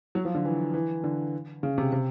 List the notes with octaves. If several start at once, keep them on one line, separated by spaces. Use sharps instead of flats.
F#3
F3
D3
E3
E3
D3
C#3
C3
C3